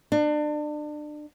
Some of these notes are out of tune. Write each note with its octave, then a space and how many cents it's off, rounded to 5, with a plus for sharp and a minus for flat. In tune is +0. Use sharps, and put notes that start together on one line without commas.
D4 +30